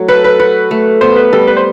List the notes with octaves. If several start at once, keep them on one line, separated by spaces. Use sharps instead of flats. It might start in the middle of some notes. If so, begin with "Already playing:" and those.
Already playing: F#3 A3
A4 B4
B4
F#4 B4
A3
B3 C5
B4
G3 A4
B4
C5